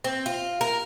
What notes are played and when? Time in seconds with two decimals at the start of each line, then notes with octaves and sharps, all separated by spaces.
0.04 C4
0.26 F4
0.61 A#4